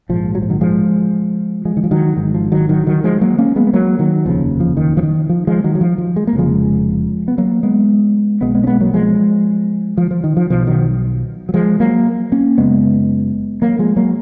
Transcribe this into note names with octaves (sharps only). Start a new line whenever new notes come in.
A#1 G#2 F3
F#3
F3
D#3 F#3
F3 G#3
F3 G#3
D#3
F3
D#3 F#3
G#1 G#2 D#3
F3
D#3 F#3
D#3 F#3
D#3 F#3
F3 G#3
F#3 A#3
A#3 C#4
G#3 B3
B3
F#3 A#3
D#3 F#3
F1 D#2 C#3 F3
F3
D#3
F3
D#3
F3
F3 G#3
D#3 F#3
F#3
F3
F3
G#3
A#3
F1 D#2 C#3 F3 G#3
B3
F#3 A#3
G#3 B3
B1 B2 G#3 B3
G#3 B3
C#4
G#3 B3
F#3 A#3
F3 G#3
F3
F3
D#3
F3
B1 B2 F3
D#3 F#3
F#3
F3 G#3
F#3 A#3
A#3 C#4
F#1 F#2 C#3 G#3 B3
F#3 A#3
F3 G#3
F#3 A#3